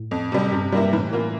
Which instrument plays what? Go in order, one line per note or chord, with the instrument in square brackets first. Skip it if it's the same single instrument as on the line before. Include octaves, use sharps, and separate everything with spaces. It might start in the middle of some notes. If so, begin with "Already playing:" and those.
Already playing: [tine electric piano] A2
[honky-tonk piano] F2
C3 G3
[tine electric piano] G2 [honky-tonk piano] C3
[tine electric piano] G2 [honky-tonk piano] G3 A#3 E4
[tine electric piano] A2 [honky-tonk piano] E3
[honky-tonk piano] A#3 F4